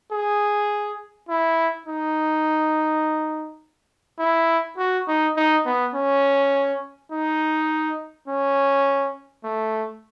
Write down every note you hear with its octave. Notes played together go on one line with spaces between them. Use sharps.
G#4
E4
D#4
E4
F#4
D#4
D#4
B3
C#4
D#4
C#4
A3